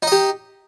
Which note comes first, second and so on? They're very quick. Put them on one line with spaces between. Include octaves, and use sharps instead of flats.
D#4 D#5 G4